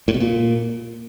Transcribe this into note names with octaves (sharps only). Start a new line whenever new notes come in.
A2
B2
A#2